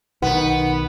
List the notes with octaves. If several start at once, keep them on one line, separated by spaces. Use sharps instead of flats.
B1 D#3 B3 D#4